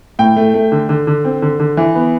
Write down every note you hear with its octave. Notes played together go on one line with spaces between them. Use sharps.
A2 G5
A3
A3
D3
D3
D3
C4
D3
D3
E3
B3